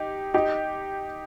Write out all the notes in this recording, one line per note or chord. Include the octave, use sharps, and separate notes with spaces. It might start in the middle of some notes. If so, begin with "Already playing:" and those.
Already playing: D#4 G4
D#4 G4